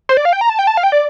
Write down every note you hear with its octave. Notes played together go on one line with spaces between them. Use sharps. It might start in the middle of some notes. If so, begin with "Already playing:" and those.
C5
D5
F5
G5
A#5
A5
G5
A5
F5
G5
D5